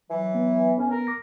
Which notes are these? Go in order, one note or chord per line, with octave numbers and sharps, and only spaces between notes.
E3 F#3
B3
A2 C#4
A#4
D6 A#6